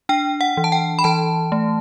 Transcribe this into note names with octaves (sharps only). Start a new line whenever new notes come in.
D4 G5
F#5
E3
A5
G5
B5
E3 A5
A3